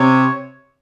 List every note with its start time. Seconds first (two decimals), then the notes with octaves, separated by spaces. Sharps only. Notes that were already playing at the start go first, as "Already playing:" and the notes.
Already playing: C3 C#5